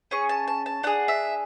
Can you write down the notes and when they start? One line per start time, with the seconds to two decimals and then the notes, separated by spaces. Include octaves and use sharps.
0.11 C#4 G#4 C#6
0.29 A5
0.48 A5
0.66 A5
0.83 D4 G#4 F#5
1.08 E5